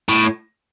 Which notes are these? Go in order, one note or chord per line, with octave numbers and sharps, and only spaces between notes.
A2